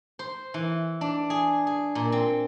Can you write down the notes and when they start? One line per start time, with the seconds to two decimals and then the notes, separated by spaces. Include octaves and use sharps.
0.19 C5
0.54 E3
1.01 D4
1.30 G#4
1.67 G#4
1.95 A#2
2.12 C4